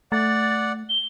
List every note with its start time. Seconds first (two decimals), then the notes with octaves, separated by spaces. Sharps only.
0.12 A3 D5 F#5 A6
0.89 G7